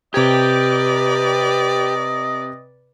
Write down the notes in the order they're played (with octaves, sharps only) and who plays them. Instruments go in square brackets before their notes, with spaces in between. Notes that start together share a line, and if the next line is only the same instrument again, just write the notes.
[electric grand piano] C3 G#6 [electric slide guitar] G4 [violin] B4 D5 [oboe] D#5